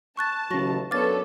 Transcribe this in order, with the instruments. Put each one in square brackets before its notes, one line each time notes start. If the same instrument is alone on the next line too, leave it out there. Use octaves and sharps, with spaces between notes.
[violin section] A5 [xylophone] C#6 F#6 A6
[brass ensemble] A1 D#2 [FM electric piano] C#3 F#3 [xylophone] C#6 A#6
[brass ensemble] F#2 D4 C#5 [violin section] B3 A4 [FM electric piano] F5 [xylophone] D6 A6